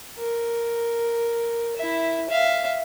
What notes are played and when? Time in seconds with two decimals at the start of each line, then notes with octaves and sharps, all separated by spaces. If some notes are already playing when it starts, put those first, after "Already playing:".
0.17 A#4
1.76 E4 E5
2.28 E5 F5